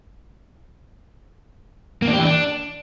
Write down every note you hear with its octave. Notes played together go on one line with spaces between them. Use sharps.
A#3
D4
G4
E3
D4